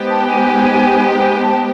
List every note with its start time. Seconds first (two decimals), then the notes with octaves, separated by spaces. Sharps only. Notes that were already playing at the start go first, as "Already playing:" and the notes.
Already playing: G#3 B3 D#4 G4 C5
0.10 A5
0.28 G#5
1.18 G#5
1.42 A5